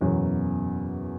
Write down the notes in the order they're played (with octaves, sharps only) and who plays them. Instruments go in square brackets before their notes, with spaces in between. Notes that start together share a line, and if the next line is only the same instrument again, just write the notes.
[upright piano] F#1 E2 B2 F#3